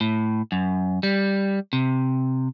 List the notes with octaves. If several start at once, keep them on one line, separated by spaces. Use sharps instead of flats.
A2
F#2
G3
C3